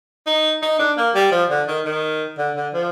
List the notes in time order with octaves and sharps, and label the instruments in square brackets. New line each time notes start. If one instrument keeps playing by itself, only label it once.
[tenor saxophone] D#4
D#4
D4
A#3
G3
F3
D3
D#3
D#3
D3
D3
F3